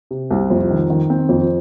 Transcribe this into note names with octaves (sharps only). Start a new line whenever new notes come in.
C3
C2
F2
D#3
D#3
C4
F2